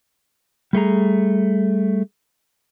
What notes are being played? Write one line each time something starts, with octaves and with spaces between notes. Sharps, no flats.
G3 A3 G#4 A#5